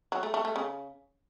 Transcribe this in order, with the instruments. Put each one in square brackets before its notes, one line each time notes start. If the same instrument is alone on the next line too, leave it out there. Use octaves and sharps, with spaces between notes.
[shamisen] F#3
A3
A3
A3
C#3